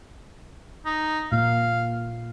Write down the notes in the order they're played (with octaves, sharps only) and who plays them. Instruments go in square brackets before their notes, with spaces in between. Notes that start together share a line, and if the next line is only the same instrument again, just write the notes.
[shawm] D#4
[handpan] A#2 A#3 [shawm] F5